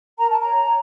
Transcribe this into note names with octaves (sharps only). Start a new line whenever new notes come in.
A#4 A#5
A5
A#5
C#5